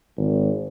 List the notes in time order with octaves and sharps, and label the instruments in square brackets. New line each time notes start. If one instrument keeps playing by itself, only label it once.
[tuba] G#1